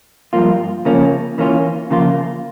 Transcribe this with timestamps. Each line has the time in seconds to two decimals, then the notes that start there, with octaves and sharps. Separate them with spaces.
0.33 G2 F3 A#3 F4
0.85 C#3 F3 A#3 C#4
1.38 E3 A#3 C#4 F4
1.90 C#3 F3 A#3 F4